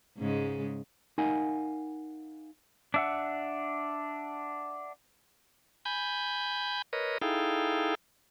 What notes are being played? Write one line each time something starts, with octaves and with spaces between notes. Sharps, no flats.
G#2 C#3 G#3
D#4 A#4 F5 F#5 G#5
D4 E5 F#5
G#5 B5 G6
A#4 B4 C#5 D#5
D#4 E4 G#4 A4 F5 G5